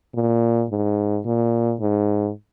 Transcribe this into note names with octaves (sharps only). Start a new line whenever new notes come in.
A#2
G#2
A#2
G#2